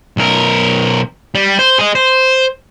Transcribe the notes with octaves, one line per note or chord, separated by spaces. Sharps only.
B1 A#4
G3
C5
G#4 D#5
C5